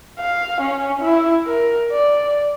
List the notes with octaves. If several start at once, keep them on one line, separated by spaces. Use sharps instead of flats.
F5
C#4
E4
A#4
D5